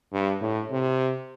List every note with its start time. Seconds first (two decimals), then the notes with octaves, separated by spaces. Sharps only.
0.13 G2
0.41 A2
0.71 C3